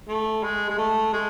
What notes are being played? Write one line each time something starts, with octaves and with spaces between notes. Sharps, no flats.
A3
G#3
G#3
A3
G#3